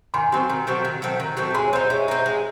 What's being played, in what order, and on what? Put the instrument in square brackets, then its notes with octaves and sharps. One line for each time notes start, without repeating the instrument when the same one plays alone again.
[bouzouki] D#3 [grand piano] G#5 C6
[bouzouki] F#3 A3 C4
D#3
F#3 A3 C4
D#3
F#3 A3 C4
D#3
F#3 A3 C4
[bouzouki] G#3 [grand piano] G#5 C6
[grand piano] C#5
[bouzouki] C4 D#4 [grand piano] C5 D#5
[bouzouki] G#3 [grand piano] C#5 E5
[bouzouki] C4 D#4
G#3